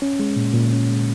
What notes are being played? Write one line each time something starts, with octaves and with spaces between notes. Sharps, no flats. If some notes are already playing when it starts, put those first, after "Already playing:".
C#4
G#3
A#2
A#2
C#4
G#3